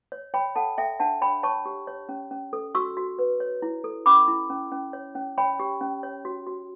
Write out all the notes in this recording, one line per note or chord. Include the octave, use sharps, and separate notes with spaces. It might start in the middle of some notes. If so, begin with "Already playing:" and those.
C#5
C#5 G5 B5
A4 F#5 A5
A4 E5 G5
D4 F#5 A5
C#5 G5 B5
C#5 A5 C#6
G4
C#5
C#4
C#4
A4
F#4 C#6 E6
F#4
B4
C#5
E4
A4
C#4 B5 D6
E4
C#4
C#4
C#5
C#4
C#5 G5 B5
G4
C#4
C#5
F#4
F#4